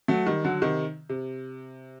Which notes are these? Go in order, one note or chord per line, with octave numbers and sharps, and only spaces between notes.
F#3 A3
D#3 G3
D3 F#3
C3 D#3
C3